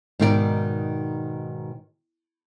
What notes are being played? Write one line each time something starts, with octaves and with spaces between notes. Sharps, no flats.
G#2 B2 D#3 D#4 G4 D5